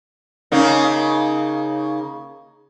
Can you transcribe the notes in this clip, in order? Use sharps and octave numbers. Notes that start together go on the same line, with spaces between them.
C#3 A#3 D#4